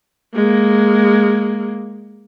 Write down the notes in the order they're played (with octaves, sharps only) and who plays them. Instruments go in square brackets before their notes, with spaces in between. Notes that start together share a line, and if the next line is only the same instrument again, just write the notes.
[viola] G#3 A#3